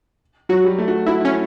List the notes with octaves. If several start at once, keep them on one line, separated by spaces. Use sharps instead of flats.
F#3 F#4
G3
A3
F#4
E4 F#4
C#4 E4